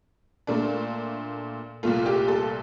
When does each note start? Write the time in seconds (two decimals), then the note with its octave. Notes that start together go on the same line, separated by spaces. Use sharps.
0.47 A#2 A3 D4
1.83 C2 A#2 A3 F4
2.06 G4
2.28 A4